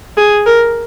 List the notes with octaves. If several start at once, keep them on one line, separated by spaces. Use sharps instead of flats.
G#4
A#4